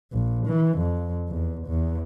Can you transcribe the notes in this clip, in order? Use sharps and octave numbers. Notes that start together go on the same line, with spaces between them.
A#1
E3
F2
E2
E2